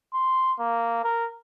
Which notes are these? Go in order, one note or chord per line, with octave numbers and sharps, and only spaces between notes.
C6
A#3
A#4